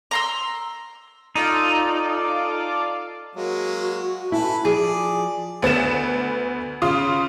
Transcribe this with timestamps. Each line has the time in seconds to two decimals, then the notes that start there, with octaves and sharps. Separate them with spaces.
0.11 A#5 C6 E6
1.35 D#4 F4 A4 D5
3.36 F#3 G#3 A#3 F#4
4.32 E4 A4 B4 G#5
4.65 F3 G#4 D5
5.62 D2 B3 A6 E7
6.82 C#3 F4 C6 D#6